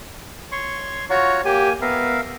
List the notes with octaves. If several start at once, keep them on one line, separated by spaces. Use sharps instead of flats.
C#5 C6 C#6
F4 F#4 C#5 A#5
A#3 G4 G#5
B3 A#4 E5 F5